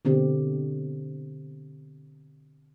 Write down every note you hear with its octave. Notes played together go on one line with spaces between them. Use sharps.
B2 D3 C4 G4